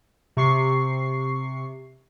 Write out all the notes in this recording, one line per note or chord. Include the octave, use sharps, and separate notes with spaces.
C3 C#6 C7